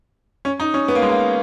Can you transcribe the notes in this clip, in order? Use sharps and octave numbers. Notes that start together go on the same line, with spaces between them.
C#4
D#4
C#4
B3
A#3
G#3
A#3